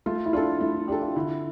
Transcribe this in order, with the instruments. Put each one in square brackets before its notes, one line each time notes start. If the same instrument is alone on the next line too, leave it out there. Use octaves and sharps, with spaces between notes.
[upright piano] A3 [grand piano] F4
[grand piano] E4
[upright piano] D4 A4 [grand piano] F4
[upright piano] A3 [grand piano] E4
[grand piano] E4
[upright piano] D4 A4 [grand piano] G4
[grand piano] F4
[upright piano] D3 [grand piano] E4